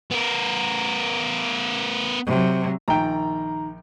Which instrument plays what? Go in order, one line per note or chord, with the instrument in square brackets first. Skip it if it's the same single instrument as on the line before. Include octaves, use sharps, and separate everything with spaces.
[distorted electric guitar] B3 A#4
[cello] C3 F#3
[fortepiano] A#1 G5 [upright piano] D#3 A#5